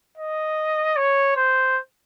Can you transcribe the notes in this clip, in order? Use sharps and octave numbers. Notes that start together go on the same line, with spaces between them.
D#5
C#5
C5